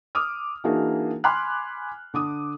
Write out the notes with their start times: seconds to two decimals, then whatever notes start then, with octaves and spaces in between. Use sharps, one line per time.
0.15 D6 D#6 F6
0.64 E3 A#3 D4 D#4 F#4 G#4
1.24 G#5 B5 C6 D6 F6 F#6
2.14 D3 D6 D#6